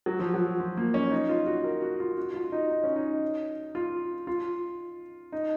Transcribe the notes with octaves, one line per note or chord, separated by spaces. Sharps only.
F#3
F3
F#3
F3
A#3
C#4
D#4
F4
F#4
A#4
F#4
F4
F#4
F4
D#4
D#4
C#4
D#4
F4
F4
D#4